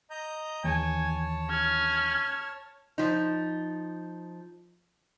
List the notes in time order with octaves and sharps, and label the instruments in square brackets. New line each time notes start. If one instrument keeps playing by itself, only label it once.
[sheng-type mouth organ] D#5 A#5 G6
[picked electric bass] D#2 D#3 E3 [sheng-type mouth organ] C#5 A5 [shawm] G#5
[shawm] C#4 [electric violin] F6 G#6
[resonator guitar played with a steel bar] F3 D#4